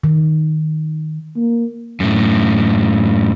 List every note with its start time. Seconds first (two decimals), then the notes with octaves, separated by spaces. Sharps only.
0.04 D#3
1.36 A#3
2.00 F#2 A2